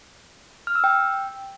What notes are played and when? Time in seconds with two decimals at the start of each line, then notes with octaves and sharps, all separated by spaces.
0.67 F6
0.75 E6
0.84 G5